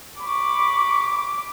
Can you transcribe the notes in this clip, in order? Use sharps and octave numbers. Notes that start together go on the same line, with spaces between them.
B5 C#6 D6